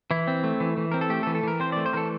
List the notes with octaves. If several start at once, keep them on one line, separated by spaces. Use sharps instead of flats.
E3 E4
C4
A3
E3
E3
C4 A#4
A4
A3 G4
A4
E3
A4
E3 A#4
C4 C5
A3 D5
C5
E3 A4 A#4